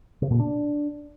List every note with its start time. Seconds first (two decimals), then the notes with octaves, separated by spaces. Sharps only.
0.22 C3
0.31 A#2
0.39 D4